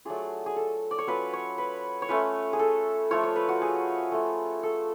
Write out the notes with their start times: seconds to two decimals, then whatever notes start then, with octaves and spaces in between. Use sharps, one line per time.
0.05 F#3 A3 D4 F4 G#4
0.46 G#4
0.56 A4
0.91 D5
0.98 C#5
1.07 F#3 C#4 F4 B4
1.33 C#5
1.58 B4
2.02 C#5
2.09 A3 C#4 F4 B4
2.53 G#4
2.59 A4
3.11 F3 A3 F4 C#5
3.23 C#5
3.36 B4
3.49 F#4
3.62 G#4
4.12 A3 F4
4.63 A4